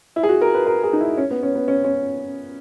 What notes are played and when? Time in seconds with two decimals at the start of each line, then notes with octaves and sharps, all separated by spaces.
0.16 E4
0.23 G#4
0.29 F#4
0.41 A#4
0.54 B4
0.67 A#4
0.84 G#4
0.93 D#4
1.00 E4
1.17 C#4
1.30 B3
1.43 C#4
1.55 B3
1.68 C#4
1.84 C#4